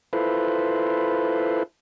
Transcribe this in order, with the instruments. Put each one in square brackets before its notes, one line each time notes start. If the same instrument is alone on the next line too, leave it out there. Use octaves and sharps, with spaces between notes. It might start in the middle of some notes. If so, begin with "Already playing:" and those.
[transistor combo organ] E4 F4 A4 B4 C5